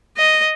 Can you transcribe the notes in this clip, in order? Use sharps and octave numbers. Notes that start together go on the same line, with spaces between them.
D#5